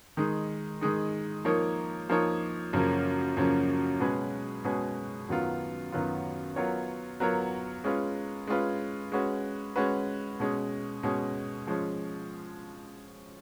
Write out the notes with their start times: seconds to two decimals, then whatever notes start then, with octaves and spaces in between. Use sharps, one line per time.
0.17 D#3 G#3 D#4
0.81 D#3 G#3 D#4
1.45 F3 A#3 D#4 A#4 C#5
2.09 F3 A#3 D#4 A#4 C#5
2.73 F#2 C#3 F3 A#3 C#4
3.37 F#2 C#3 F3 A#3 C#4
4.00 B2 G#3 C#4 G#4 B4
4.64 B2 G#3 C#4 G#4 B4
5.29 F#2 D#3 F#3 B3 F4
5.92 F#2 D#3 F#3 B3 F4
6.56 F#3 B3 F4 A#4 C#5
7.20 F#3 B3 F4 A#4 C#5
7.84 G#3 C#4 F4 B4
8.47 G#3 C#4 F4 B4
9.12 G#3 C#4 F#4 B4
9.76 G#3 C#4 F#4 B4
10.40 B2 G#3 C#4
11.03 B2 G#3 C#4
11.67 F3 G#3 C#4